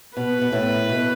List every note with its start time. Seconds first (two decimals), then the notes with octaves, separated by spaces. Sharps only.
0.17 B2 B4
0.42 B2
0.52 A2
0.89 B2